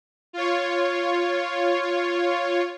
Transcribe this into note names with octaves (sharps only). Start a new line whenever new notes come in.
F4 C#5